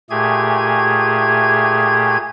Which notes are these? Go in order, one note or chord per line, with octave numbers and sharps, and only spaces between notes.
A#2 A3 G4 G#4 G#5 G#6